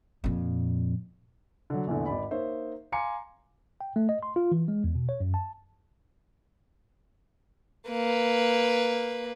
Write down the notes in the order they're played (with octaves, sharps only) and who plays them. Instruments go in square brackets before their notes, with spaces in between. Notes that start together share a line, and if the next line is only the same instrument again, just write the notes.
[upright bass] F2 A#2
[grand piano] D3 F#3
A#1 E2 A2 D3
G#1 D5 B5
A#3 D#4 C5 C#5 E5
F5 G#5 A#5 C6 D6 C#7
[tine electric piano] G5
A3
D#5
C6
F4
E3
G#3
E2
B2
C#5
F#2
A5
[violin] A#3 B4